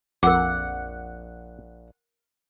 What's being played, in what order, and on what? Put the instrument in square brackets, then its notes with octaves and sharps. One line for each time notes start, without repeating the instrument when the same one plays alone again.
[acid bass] A#1 [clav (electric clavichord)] F2 [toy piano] A#4 D6 [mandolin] F#5